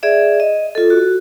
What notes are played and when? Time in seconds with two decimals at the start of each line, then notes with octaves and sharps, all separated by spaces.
0.03 G#4 D5 E5
0.40 D#5
0.75 F4 A4
0.90 F#4